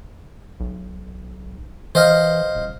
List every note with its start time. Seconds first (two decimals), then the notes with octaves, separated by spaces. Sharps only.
0.60 B1
1.95 E3 C5 D#5 F5
2.55 D#1